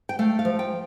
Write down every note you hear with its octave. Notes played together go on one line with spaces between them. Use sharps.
G5
A3 F5
F5
F3
G5